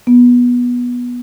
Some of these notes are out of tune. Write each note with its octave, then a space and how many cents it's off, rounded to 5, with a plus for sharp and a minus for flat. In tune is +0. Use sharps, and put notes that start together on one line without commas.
B3 -15